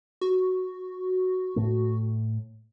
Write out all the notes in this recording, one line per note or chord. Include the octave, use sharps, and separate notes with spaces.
F#4
A2 A3